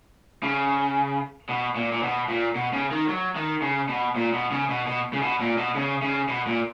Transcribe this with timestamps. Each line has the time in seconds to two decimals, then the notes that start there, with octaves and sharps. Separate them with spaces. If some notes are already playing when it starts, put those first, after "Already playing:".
0.43 C#3
1.49 B2
1.76 A#2
1.92 A#2
2.03 B2
2.29 A#2
2.55 B2
2.73 C#3
2.91 D#3
3.09 F#3
3.36 D#3
3.62 C#3
3.89 B2
4.16 A#2
4.33 B2
4.51 C#3
4.69 B2
4.87 B2
5.13 C#3
5.22 B2
5.40 A#2
5.57 B2
5.75 C#3
6.02 C#3
6.29 B2
6.47 A#2